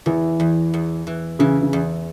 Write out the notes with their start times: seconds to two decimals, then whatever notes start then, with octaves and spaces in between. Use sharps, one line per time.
0.06 E2 E3
0.40 E2
0.74 E2
1.07 E3
1.39 C#3 E3
1.62 C#3
1.73 E2